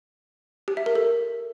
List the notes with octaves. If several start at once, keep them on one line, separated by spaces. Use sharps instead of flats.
G4
E5
A#4
A4